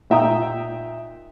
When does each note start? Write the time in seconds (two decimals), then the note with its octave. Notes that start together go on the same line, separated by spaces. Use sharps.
0.10 A#2 D#4 E5 G5 A#5 D#6